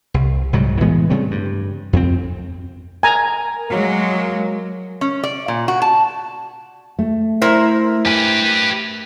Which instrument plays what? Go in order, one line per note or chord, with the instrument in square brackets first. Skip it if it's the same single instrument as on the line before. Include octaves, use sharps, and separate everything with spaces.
[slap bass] C2
C2 G#2 F#3 G3
A2 E3 G#3 B3
C#3 G3 A3 C4
G2
F2 C4
[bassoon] A#4 [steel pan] G#5 A#5
[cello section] F#3 G#3 [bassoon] A#3
[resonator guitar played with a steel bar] C#4
D5
A#2
F#4
A5
[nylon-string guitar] A3
[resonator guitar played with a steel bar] E4 A#4 C5
[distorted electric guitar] G4 B4 [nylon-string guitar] G#5